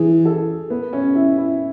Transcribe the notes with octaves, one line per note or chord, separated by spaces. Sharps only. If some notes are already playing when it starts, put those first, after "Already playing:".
Already playing: E3 G#4
A4
B3
C#4
E4
E4